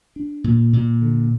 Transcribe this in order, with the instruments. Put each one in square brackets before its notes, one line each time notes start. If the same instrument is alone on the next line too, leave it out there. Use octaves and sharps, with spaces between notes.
[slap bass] D4
A#2
A#2
D3